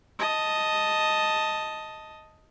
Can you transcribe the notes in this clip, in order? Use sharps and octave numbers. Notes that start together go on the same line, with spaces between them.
D#5 A5